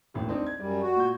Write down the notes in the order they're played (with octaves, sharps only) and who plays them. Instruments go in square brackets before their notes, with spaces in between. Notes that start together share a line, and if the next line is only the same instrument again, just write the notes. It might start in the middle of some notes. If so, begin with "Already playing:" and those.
[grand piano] E1 A1 D#2
C4 D4 D#4
G#6
[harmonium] F#2 G3 [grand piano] D5
[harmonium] F#4
[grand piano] A#2 G6